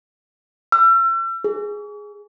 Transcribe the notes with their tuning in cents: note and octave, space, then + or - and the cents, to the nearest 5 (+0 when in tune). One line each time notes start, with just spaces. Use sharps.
E6 +40
G#4 +0